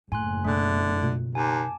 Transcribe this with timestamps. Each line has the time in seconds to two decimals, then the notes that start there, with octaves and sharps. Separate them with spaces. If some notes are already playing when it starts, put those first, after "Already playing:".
0.12 F#1 A2 G#5 C6 F#6
0.44 B2 D3 A3 F#6
1.02 B2 F4
1.35 D#2 G#5 A5 D6